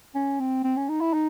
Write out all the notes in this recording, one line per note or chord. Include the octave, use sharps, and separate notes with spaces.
C#4
C4
C4
C#4
D#4
E4
D#4